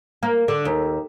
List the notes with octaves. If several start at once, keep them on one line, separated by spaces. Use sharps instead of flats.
A#3
D3
D#2